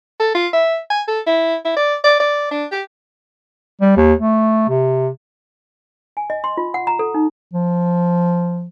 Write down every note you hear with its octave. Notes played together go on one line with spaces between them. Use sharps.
A4
F4
E5
G#5
A4
E4
E4
D5
D5
D5
D4
G4
G3
D#2
A3
C3
G#5
D#5
C6
F4
F#5
A#5
A4
D#4
F3